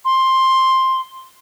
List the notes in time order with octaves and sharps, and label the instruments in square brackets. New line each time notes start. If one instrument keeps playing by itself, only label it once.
[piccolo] C6